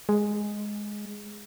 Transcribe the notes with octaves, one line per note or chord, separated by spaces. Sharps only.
G#3